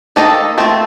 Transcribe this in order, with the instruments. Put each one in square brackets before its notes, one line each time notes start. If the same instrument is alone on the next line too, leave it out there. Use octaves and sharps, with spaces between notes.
[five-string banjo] D#3 A#3 D#4 A4 D#5
A3 C4 F4